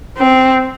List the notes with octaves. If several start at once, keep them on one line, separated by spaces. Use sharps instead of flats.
C4